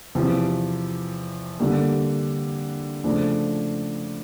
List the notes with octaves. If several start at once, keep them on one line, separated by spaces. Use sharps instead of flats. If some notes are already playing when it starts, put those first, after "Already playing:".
E2 C3 F3
D3 G3 A#3
C#3 F3 A3 D4